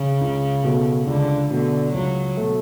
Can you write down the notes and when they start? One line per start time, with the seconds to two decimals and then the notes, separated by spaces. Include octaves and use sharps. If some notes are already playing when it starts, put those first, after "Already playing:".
Already playing: C#3
0.21 C#2
0.64 B2 A3
1.07 C#2 D3
1.50 B2 D3 A3
1.94 C#2 F#3
2.37 B2 A3